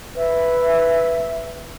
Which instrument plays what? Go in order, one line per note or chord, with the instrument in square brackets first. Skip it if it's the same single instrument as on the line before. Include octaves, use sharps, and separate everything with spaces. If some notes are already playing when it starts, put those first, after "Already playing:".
[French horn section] B4 [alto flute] E5